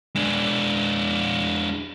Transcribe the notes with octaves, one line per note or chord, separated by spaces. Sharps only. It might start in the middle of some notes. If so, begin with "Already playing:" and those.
G#3 D4